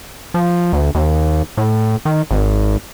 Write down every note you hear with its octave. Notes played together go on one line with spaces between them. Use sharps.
F3
D2
D#2
A2
D#3
G#1